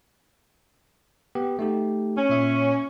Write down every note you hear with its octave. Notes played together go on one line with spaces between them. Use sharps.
B3 G4
A3 D#4 G4
C#4
A#2 E5